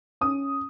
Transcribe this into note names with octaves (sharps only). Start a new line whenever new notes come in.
C#4 D#6